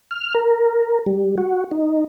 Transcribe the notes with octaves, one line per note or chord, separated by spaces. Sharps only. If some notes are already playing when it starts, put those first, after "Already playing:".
F6
A#4
G3
F#4
D#4